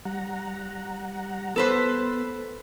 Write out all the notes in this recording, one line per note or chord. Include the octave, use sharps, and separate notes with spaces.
G3 F#5 A#5
B3 A4 B4 C5